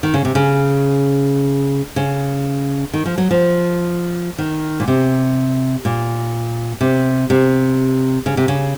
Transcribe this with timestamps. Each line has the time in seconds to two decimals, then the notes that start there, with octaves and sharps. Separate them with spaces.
0.03 D#3
0.14 C#3
0.25 C3
0.35 C#3
1.96 C#3
2.94 D#3
3.06 F3
3.18 F#3
3.31 F3
4.38 D#3
4.80 A#2
4.88 C3
5.85 A#2
6.81 C3
7.30 C3
8.26 C#3
8.37 C3
8.48 C#3